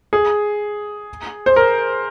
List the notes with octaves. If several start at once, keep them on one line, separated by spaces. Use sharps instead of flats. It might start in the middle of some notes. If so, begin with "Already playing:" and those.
G#4
C5
A#4